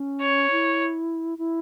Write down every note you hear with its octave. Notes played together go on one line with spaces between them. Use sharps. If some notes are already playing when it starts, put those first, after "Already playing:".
Already playing: C#4
C#5
E4
E4